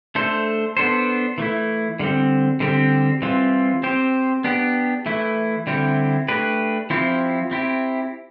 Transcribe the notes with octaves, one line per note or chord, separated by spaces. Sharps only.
A3 D4 A4 C5
B3 D4 A4 C5
E3 A3 E4
D3 G3 C4
D3 G3 C4 G4
E3 G3 C4 F4
C4 G4 C5
B3 D4 G4
E3 A3 E4
D3 G3 C4 E4 G4
A3 D4 G4 B4
F3 C4 E4 G4
C4 E4 G4